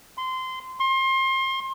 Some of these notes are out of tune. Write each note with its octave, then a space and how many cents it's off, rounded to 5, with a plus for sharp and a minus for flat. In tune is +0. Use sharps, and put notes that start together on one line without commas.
C6 -20
C6 +30